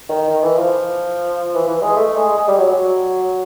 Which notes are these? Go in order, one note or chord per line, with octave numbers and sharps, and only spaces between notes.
D#3
D#3
E3
F3
E3
E3
G#3
A3
G#3
G#3
G3
F#3
F#3